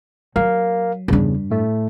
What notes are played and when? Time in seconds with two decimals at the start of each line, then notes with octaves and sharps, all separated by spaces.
0.36 F#3 A#4 F5
1.08 E2 G2 C#3 D4
1.50 A2 A3